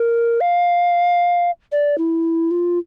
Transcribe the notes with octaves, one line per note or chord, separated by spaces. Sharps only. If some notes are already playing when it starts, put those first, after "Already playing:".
Already playing: A#4
F5
D5
E4
F4